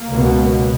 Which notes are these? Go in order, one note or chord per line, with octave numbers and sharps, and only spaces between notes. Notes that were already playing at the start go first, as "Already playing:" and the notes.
Already playing: A#3
C#2 B2